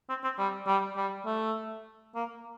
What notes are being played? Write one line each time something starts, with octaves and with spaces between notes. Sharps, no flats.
C4
C4
G3
G3
G3
A3
A#3